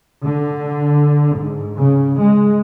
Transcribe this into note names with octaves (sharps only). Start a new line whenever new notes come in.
D3
G#2
C#3
G#3